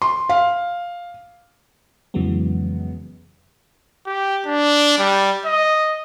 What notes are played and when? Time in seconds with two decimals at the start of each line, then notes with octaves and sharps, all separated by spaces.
0.02 C6
0.29 F5
2.14 F2 C#3 E3 F#3 G#3 B3
4.06 G4
4.46 D4
4.98 G3
5.45 D#5